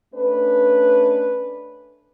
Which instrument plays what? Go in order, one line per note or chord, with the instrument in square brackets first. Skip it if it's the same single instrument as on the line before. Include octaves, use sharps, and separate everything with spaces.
[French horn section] A3 C#4 D4 B4